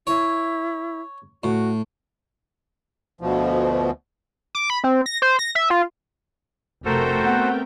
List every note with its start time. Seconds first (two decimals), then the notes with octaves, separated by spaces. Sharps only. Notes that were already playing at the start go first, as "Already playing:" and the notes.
0.07 E4 C#5
1.44 A2 F#4
3.21 D2 B2 F3
4.55 D6
4.70 B5
4.84 C4
5.06 A#6
5.22 C5
5.39 A#6
5.55 E5
5.70 F4
6.85 F1 A3 F#4 A4 A#4 C5 G5
7.25 B3 C4 F#5